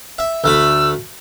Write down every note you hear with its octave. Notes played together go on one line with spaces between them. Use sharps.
E5
D2 A3 B5 E6